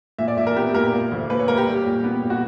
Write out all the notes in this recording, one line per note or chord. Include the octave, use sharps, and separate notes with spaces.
A#2 E5
D5
A#2 E5
A#4
B3 G4
A#2 A#4
A#3
D2
A#3 B4
C#5
A#3 A#4
G4
G3
A#2
B3
A#2
F#4